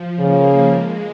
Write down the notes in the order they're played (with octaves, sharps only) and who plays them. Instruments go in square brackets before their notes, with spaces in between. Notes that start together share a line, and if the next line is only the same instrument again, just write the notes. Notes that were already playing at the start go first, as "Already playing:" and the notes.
Already playing: [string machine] F3
[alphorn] C#3 [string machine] A#3
[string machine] G#3